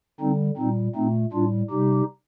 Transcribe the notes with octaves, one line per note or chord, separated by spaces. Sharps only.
D3 G3 C4 D#4
A#2 G3 C4 D#4
A#2 A3 C4 D#4
A2 G3 D4 F4
C3 G3 D#4 G4